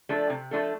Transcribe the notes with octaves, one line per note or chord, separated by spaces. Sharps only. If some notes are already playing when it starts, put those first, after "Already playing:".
F3 A3 D4 A4
C3
F3 A3 D4 A4